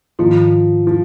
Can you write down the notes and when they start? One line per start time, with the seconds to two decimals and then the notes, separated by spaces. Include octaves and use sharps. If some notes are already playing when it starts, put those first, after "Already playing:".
0.19 G#2 D#3 F3 A#3
0.87 F3